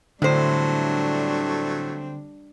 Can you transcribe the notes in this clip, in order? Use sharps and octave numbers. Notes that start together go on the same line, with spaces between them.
A2 D3 F#3 G3 A3 C4 D4 C5